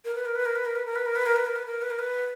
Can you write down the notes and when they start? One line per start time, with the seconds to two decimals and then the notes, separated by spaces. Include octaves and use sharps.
0.05 A#4
0.15 B4
0.26 A#4
0.35 B4
0.45 A#4
0.56 B4
0.65 A#4
0.75 B4
0.86 A#4
0.96 B4
1.06 A#4
1.16 B4
1.26 A#4
1.36 B4
1.46 A#4
1.56 B4
1.66 A#4
1.82 B4
1.91 A#4
1.99 B4